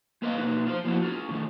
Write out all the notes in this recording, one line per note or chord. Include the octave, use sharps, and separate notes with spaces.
G#3 A#3 B4 D#5 F5
B2 A#3 D#4 B4
F4 C5
F3 A#3 B3 E4 F#4
F4 G#4
A2 D#3 A3